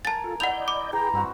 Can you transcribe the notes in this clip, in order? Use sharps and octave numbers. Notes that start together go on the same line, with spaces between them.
A#4 G#5 A5 A6
F4 A4
E4 D5 D#5 F#5 B5 G6 F7
D6
E3 G#4 G5 A#5
G2 G3 C4 F#4